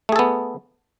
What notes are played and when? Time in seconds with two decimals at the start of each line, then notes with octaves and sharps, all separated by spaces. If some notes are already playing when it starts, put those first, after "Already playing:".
0.09 A3
0.12 G#4
0.16 A4
0.19 B3